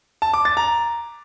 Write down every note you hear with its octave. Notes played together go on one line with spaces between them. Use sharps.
A5
D6
A6
A#5